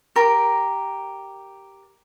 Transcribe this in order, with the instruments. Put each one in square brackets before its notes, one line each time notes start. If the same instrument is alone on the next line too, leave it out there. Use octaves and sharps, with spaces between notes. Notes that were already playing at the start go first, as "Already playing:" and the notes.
[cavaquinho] G4 A#4